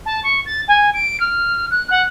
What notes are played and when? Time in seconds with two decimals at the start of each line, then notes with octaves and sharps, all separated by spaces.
0.06 A5
0.23 C#6
0.46 A6
0.68 G#5
0.94 D7
1.20 F6
1.71 F#6
1.90 F#5